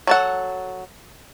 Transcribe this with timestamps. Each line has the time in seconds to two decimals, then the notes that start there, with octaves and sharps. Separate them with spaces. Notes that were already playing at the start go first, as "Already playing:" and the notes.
0.07 F#3 A4 F#5